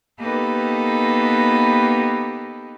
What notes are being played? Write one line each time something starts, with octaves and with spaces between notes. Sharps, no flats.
A#3 B3 D#4 G4 A4 B4